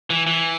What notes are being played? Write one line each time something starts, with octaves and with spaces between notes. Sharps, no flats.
E3
E3